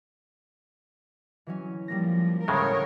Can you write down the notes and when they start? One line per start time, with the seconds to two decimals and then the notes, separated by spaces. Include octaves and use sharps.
1.47 E3 F#3 C#4
1.88 F3 G3 A#3 A#6
2.48 D2 A2 C#3 G#3 A#4 C#5